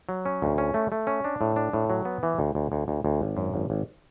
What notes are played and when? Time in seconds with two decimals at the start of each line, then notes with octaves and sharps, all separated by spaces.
0.09 F#3
0.26 C#4
0.42 D2
0.58 C#4
0.74 A3
0.92 A3
1.07 C#4
1.24 D4
1.41 A2
1.56 D4
1.73 A2
1.90 F#3
2.05 B3
2.23 E3
2.39 D2
2.55 D2
2.72 D2
2.88 D2
3.05 D2
3.21 G#1
3.37 F#2
3.54 G#1
3.70 G#1